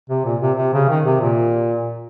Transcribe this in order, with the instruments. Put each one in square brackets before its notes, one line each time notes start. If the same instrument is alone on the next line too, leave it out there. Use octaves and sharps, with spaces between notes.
[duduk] C3
A#2
C3
C3
C#3
D#3
C3
A#2